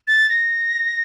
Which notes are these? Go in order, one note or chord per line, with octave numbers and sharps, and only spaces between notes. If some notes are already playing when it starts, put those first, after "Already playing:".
A6
A#6